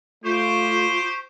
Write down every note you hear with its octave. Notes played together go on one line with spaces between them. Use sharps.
A3 F4 G4 C5 C#6